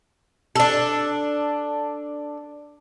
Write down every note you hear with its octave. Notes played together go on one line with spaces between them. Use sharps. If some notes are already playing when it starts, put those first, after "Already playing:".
D4 A4